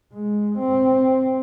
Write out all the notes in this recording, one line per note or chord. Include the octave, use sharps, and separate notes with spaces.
G#3
C4